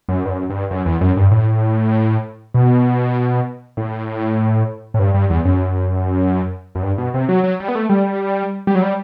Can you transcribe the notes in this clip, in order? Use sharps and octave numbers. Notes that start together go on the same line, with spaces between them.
F#2
G2
F#2
G2
F#2
E2
F#2
G2
A2
B2
A2
A2
G2
G2
E2
F#2
F#2
G2
B2
C3
F#3
F#3
G3
B3
A3
G3
G3
F#3
G3